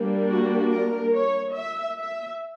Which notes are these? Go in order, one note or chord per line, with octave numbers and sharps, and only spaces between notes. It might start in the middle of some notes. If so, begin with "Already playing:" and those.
Already playing: G3 A#3 D4
F#4
A#4
C#5
E5
E5